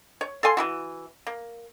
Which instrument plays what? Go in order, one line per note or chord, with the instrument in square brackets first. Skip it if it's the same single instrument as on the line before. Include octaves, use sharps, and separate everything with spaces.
[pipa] C#5
A4 F5 G#5 C6
E3 E4 F#4
A#3